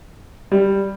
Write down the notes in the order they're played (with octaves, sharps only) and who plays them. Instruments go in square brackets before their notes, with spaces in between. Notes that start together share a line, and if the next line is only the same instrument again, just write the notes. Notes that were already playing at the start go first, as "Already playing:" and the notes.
[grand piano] G3